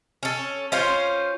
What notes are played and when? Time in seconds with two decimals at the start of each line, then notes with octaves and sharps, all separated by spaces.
0.23 C#4 A4
0.72 C#4 F4 C5